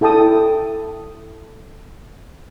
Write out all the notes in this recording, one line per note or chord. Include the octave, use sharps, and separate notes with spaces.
E4 A4 G5 A5 D#6